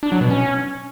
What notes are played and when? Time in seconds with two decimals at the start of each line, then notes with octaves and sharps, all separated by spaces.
0.03 D4
0.12 F#3
0.21 B2
0.30 C#4